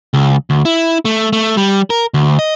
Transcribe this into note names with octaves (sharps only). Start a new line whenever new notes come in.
C#2
D2
E4
A3
A3
G3
A#4
D2
D#5